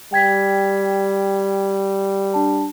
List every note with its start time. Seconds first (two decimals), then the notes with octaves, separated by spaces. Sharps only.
0.13 G3 G5 G#6 B6
2.34 D4 A5